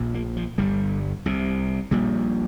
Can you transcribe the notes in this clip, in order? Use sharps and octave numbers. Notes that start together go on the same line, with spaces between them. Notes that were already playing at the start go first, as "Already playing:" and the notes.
Already playing: A#1 A#2
A#3
F3
G1 G2 G3
C2 C3
A#1 A#2 G3